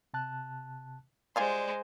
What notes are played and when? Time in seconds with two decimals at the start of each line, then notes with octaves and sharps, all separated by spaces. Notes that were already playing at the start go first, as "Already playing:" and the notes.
0.14 C3 A5 F#6
1.36 G3 G#3 F4 C5 D5 G#5